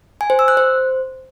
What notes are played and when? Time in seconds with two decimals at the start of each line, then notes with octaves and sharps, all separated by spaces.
0.21 G#5
0.30 C5
0.39 E6
0.48 F#6
0.57 C5